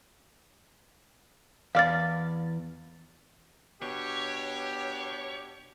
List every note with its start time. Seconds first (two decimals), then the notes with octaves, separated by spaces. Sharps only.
1.75 E2 D5 F5 F6 A6
3.82 B2 D4 G4 C#5